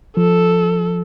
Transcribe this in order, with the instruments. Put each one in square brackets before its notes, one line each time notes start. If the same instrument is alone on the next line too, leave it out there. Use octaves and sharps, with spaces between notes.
[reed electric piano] F3 [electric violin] A4